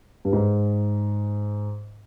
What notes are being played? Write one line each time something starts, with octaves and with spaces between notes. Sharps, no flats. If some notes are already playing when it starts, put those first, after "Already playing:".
G2
G#2